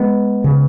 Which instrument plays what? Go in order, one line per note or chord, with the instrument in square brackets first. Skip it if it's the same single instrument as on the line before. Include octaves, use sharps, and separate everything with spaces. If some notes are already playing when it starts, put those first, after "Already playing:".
Already playing: [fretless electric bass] G#3 B3
C#3